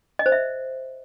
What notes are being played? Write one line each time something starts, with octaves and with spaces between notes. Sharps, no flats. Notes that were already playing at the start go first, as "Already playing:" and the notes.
D#5
C5
E5